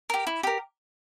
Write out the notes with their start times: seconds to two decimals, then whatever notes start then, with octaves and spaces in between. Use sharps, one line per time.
0.10 G4 A#4
0.27 E4
0.43 G4 A#4